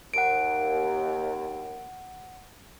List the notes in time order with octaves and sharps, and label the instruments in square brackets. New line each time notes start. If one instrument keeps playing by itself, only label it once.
[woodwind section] D#2 [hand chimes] F#5 D7